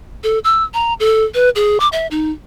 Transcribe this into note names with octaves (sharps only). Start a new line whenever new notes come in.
A4
E6
A#5
A4
B4
G#4
D6
E5
D#4